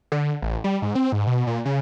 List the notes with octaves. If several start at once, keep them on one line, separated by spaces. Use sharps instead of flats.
D3
A1
G3
G#2
C4
G#2
B2
A#2
C#3